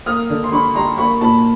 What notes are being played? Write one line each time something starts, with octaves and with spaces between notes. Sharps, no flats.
A#3 D#6 F6
D3
C6
D3 B5 C#6
G3 A#5 C6
A#3 B5 C#6
A#2 A5 B5